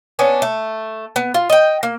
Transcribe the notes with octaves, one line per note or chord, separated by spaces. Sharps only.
B3 C#4 D4
A3
B3
F4
D#5 G5
A#3